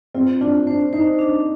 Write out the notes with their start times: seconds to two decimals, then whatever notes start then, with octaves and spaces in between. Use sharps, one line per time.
0.14 C4 F4
0.41 D4 F4
0.67 D4 C5
0.93 D#4 C5
1.19 D4